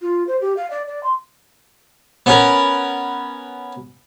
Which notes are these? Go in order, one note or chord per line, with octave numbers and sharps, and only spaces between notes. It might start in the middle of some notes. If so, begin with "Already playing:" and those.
F4
C5
G4
F5
D5
D5
C6
B3 C#4 A#4